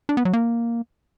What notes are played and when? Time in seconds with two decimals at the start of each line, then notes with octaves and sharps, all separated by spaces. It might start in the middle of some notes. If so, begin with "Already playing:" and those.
0.09 D4
0.17 B3
0.25 F#3
0.33 A#3